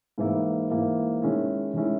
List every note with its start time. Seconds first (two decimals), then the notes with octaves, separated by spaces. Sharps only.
0.18 G#2 E3 A#3 E4
0.70 G#2 E3 A#3 E4
1.22 D#3 G#3 C#4 E4
1.74 D#3 G#3 C#4 E4